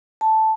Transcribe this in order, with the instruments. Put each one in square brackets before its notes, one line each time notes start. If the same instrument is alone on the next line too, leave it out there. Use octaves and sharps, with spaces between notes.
[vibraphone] A5